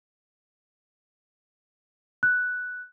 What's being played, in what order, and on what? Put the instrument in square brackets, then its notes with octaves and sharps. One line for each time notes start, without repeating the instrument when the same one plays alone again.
[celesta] F#6